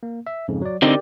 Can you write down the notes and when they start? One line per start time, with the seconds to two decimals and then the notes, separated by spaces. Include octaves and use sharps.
0.03 A#3
0.27 E5
0.48 F2 G#2 C#3
0.62 F#3 D5
0.82 D3 C4 D#4 G4 A#4 D5